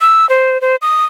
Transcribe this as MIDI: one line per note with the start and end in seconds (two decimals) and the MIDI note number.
0.01 0.28 88
0.29 0.60 72
0.61 0.76 72
0.82 1.04 87